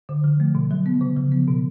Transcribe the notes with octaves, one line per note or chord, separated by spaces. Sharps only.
D3
F3
A3
B2
F#3
B3
C#3
F3
B3
B2